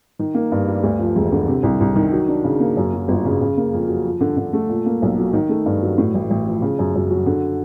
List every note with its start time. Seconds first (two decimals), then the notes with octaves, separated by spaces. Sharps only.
0.19 D#3
0.34 A#3
0.52 G2
0.67 G3
0.83 D2
0.99 F3
1.16 E1
1.32 D3
1.48 C3
1.63 C2
1.80 C2
1.96 D#3
2.12 F#3
2.28 D4
2.44 C#3
2.60 A#3
2.77 F#2
2.93 F#3
3.08 G1
3.25 C#3
3.41 C#3
3.57 A#3
3.73 F2
3.89 F#3
4.05 F3
4.21 D3
4.37 D3
4.53 A3
4.69 A#2
4.86 A#3
5.02 B1
5.18 F#3
5.33 D#3
5.49 A3
5.66 G2
5.82 F#3
5.98 A2
6.15 A1
6.30 A1
6.47 F3
6.62 C#3
6.79 F#2
6.95 F#2
7.11 F#3
7.26 D3